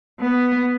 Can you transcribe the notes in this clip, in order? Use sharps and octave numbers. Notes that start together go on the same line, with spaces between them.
B3